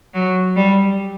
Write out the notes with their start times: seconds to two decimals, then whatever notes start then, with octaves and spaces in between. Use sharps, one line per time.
0.14 F#3
0.56 G3